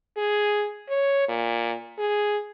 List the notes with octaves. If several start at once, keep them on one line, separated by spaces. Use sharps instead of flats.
G#4
C#5
A#2
G#4